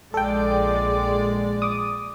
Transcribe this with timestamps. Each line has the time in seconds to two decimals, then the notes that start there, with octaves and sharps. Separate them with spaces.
0.14 A#1 G#3 A4 D5 G5
1.62 D6 D#6